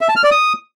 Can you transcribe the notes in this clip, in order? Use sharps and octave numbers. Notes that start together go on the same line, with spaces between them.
E5
A5
F6
D5
D#6